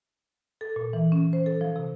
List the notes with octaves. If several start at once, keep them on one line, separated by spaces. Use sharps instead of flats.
A4
A#2
E3
C#4
C5
A4
F3
C3